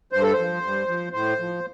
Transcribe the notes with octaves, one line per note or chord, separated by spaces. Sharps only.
G2 C5
A4
C5
F3
G2
F3
A2 C5
F3